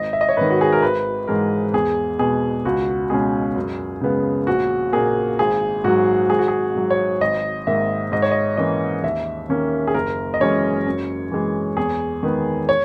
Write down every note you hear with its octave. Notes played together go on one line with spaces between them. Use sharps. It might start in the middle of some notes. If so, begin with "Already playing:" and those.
Already playing: G#1 D#5
E5
D#5
C#5
G#2 D#3 B4
F#4
G#4
A#4
G#1 B4
G#2 E3 G#3 A#4
E2 G#4
B2 G#3 B3 G#4
C#2 F#4
B2 G#3 C#4 G#4
F#2
C#3 G#3 B3
A#1 F#4
A#2 A#3 G#4
G#1 G#4
G#2 F#3 F#4
G#1 G#4
F#4
G#4
G#2 F#3
C#5
G#1 D#5
G#2 D#3 A#3 E5
G#2 D#5
C#5
D#5
E3 A#3 C#4 D#5
D#2 E5
D#3 A#3 C#4
G#4
F#1 A#4
D#5
F#2 E3 G#3 C#4 C#5
F#2
E3 G#3
E2 G#4
D#3 G#3 B3
C#5